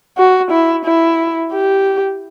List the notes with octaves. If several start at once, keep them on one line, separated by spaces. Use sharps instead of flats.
F#4
E4
E4
G4